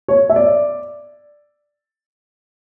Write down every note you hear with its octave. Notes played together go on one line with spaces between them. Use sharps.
C#5
E5
D5